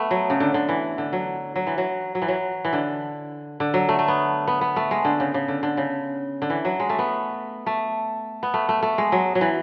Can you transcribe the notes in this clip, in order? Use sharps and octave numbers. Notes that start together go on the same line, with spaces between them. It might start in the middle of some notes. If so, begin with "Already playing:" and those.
Already playing: A3 B3
F#3
C#3
D3
D3
E3
D3
F#3
F#3
E3
F#3
F#3
E3
F#3
E3
D3
D3
F#3
A3
A3
B3
B3
B3
A3
G#3
D3
C#3
C#3
D3
D3
C#3
D3
E3
F#3
G#3
A3
B3
A3
B3
A3
A3
A3
G#3
F#3
F#3
E3